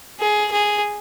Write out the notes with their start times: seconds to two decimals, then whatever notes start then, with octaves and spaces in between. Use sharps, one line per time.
0.20 G#4
0.51 G#4